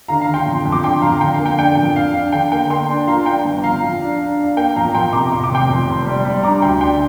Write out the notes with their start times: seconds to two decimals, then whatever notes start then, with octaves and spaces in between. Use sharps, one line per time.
0.08 D3 F5 A#5
0.21 F5 A#5
0.28 D3
0.34 G5 C6
0.46 F2
0.65 F2
0.72 D6
0.83 D3 G5 C6
1.02 F2 F5 A#5
1.21 D3 G5
1.34 F5
1.39 A#3
1.46 G5
1.59 D4 G5
1.77 F2
1.96 D4 F5
2.14 D4 F5
2.32 D3 G5
2.52 A#3 G5
2.70 A#3 G5 C6
2.89 D4
3.07 F3 F5 A#5
3.26 D4 G5
3.45 G1
3.63 F2 F5 A#5
3.82 F3
4.01 D4
4.19 D4
4.39 D4
4.44 F5
4.57 A#3 G5
4.76 F2 F5 A#5
4.94 F2 G5 C6
5.12 C3 A#5 D6
5.31 C3 C6
5.44 D6
5.50 F1 G5 C6
5.69 F2
5.88 F1
6.06 G3
6.25 G3
6.43 D4 A#5 D6
6.62 D2 G5 C6
6.81 D4 G5